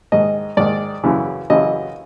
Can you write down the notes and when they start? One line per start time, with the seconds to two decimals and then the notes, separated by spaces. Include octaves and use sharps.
0.12 G#2 D#3 D#5
0.57 G#2 D#3 D5
1.04 F#2 C#3 E3
1.50 F#2 C#3 E3 D#5